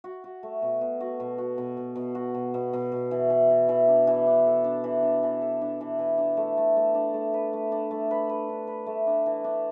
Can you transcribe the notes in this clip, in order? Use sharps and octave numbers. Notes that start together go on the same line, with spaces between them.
F#4
F#4
A3
B2
B2
F#4
B2
F#4
B2
B2
B2
F#4
B2
B2
B2
B2
E3
E3
E3
E3
D4
E3
D4
A4
D4
E3
D4
E3
A4
D4
E3
E3
D4
A3
A3
A3
D4
A3
B4
A3
D4
A3
B4
B4
D4
B4
A3
D4
E3
D4